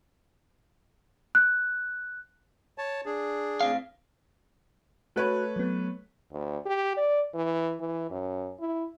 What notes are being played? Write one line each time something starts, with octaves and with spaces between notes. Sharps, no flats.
F#6
C#5 A5
D4 G#4
A2 C4 F5
A3 F#4 B4 C#5 F#6
F#3 B3
D2
G4
D5
E3
E3
F#2
E4